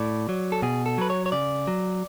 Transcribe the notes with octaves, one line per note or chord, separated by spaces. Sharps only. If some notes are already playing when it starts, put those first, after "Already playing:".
Already playing: A2 D5
F#3
A4
B2 G#4
A4
F#3 B4
C#5
C#5
C#3 D5
F#3